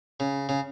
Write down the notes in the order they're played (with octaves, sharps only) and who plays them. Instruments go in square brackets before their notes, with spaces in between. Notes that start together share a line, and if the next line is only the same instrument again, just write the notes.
[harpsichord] C#3
C#3